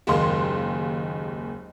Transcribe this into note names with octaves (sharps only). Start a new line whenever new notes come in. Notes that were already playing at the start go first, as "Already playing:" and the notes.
F#1 D#2 G#3 A#3 F5 C6